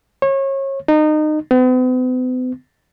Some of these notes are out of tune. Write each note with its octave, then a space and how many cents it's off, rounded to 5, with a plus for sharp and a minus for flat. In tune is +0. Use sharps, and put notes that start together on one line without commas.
C#5 -30
D#4 -25
B3 +45